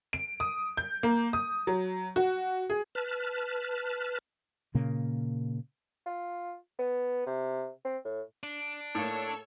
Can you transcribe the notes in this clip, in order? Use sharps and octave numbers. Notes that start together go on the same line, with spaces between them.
D7
D#6
G6
A#3
D#6
F#3
F#4
G#4
B4 A5 F6
A#2 C#3 A#3
F4
B3
C3
C4
A2
D4
A2 A#3 A4 C#5 C#6 E6